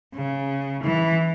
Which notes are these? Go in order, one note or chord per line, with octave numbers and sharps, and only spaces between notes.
C#3
E3